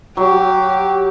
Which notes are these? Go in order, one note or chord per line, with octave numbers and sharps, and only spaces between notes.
F#3 G4